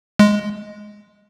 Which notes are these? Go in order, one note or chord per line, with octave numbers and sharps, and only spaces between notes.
G#3